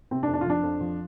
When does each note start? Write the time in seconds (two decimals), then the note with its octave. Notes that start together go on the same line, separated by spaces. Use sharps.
0.11 C3 C4
0.23 D4
0.28 F2
0.34 D4
0.41 F4
0.46 F3 D4
0.63 F2
0.81 F3